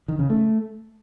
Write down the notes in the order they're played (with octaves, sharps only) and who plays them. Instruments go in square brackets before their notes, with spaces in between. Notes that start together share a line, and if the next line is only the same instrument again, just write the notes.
[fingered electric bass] D#3
C#3
A3